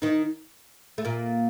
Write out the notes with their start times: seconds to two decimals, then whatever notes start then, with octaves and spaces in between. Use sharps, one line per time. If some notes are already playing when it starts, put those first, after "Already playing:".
0.02 D#3 D#4
0.98 A3
1.05 A#2 A#3